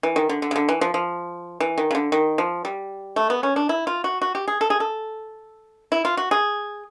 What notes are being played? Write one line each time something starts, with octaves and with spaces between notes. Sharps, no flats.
E3
D#3
D3
D3
C#3
D3
E3
F3
F3
E3
D#3
C#3
D3
D#3
F3
G3
A3
B3
C#4
D4
E4
F4
F#4
F#4
G4
G#4
A4
G#4
A4
E4
F4
F#4
G#4